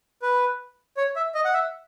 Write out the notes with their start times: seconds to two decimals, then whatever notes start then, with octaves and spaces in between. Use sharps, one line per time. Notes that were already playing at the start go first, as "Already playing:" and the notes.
0.22 B4
0.97 C#5
1.16 E5
1.35 D#5
1.45 F#5
1.53 E5